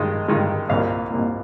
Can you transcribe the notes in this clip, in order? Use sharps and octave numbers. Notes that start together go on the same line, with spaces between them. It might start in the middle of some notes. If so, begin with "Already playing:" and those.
Already playing: G2 D#3 G#3
G2 D#3 G#3
C2 A#2 G3 A#3 F5
C2 A#2 G3 A#3